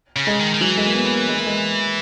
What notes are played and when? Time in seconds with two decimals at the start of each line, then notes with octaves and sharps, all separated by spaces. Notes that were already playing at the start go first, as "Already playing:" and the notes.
0.16 C#3
0.27 G#3
0.39 D#3
0.54 D#3
0.61 E3 F#3
0.78 G#3
0.86 A#3
0.95 B3
1.05 B3
1.12 A#3
1.28 G#3
1.37 A#3
1.46 G#3